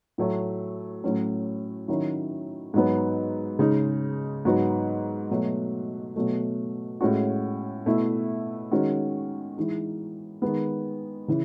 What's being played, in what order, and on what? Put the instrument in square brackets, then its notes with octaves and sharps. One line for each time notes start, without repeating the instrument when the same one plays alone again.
[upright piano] A2 F#3 A3
A2 F#3 C#4
D#3 F#3 C#4 E4
G#2 F#3 B3
C#3 G#3 D#4
G#2 F#3 B3 F#4
B2 F#3 A3
B2 F#3 A3
A2 G#3 C#4 F#4
B2 A3 E4
D#3 G#3 C#4 F#4
E3 G#3 D#4
D#3 G#3 B3
C#3 E3